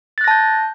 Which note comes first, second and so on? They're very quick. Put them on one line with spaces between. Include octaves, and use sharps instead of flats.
A6 F#6 A#6 A5 G6